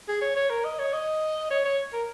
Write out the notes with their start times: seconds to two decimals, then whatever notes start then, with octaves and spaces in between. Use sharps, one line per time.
0.08 G#4
0.21 C#5
0.36 C#5
0.50 A#4
0.65 D#5
0.79 C#5
0.93 D#5
1.50 C#5
1.65 C#5
1.93 A#4